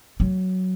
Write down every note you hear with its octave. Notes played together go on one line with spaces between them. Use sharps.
F#3